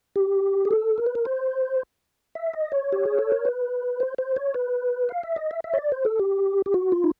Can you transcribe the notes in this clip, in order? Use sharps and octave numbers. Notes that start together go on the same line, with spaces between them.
G4
G#4
A4
A#4
B4
A#4
C5
E5
D#5
C#5
G4
G#4
A4
A#4
B4
C5
C5
C#5
B4
F5
E5
D#5
E5
E5
C#5
D5
C5
A4
G4
G4
F#4
F4
D#4